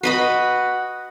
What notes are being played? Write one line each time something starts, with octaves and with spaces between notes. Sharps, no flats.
F#4 B4 D#5 B5